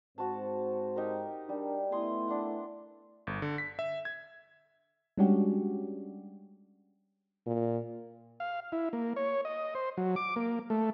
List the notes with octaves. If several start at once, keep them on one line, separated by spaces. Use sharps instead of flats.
G#2 C4 F#4 C5 A5
D#4 G4 A#4
G3 D4 A#4
A3 B3 E4 G#5 C6 D#6
D4 F#5
G1
D3
B6
E5
G#6
G3 G#3 C#4 D4 F#4 G4
A#2
F5
E4
A#3
C#5
D#5
C5
F#3
D6
A#3
A3